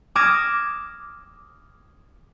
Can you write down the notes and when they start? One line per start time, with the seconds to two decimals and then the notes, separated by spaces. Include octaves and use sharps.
0.15 D6 D#6 F6 G#6 A#6 E7